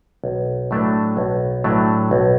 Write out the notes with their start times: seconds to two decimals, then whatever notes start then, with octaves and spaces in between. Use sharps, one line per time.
0.24 B1
0.71 A2 F#3 A3 D4
1.17 B1
1.64 A2 F#3 A3 D4
2.11 B1